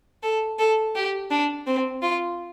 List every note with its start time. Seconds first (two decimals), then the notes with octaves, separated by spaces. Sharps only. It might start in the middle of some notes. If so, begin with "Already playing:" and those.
0.23 A4
0.59 A4
0.95 G4
1.31 D4
1.67 C4
2.02 F4